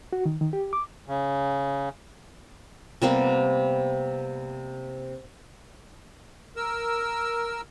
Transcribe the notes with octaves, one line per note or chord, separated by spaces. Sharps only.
F#4
D#3
D#3
G4
D6
C#3
C3 G3 A#3 B3
A#4 E6